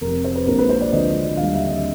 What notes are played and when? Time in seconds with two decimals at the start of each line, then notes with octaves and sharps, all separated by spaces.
0.01 F1 F2 C3 A#4
0.24 C5
0.35 B4
0.46 A#1 A#2 F3 G#3 A#4
0.59 B4
0.69 C5
0.81 D5
0.92 D2 D3 F3 G#3 D#5
1.37 D#2 D3 G3 F5
1.53 E5
1.68 D#5